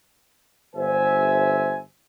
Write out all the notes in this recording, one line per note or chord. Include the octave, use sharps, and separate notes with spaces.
G1 C5 E5 G#5